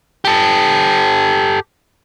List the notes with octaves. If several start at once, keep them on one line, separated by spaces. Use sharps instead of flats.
G4 A4